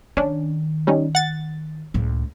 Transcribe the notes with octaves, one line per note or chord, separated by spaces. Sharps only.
D#3 C#4 D4
G3 C#4 D#4
F#5 A6
C#2 A2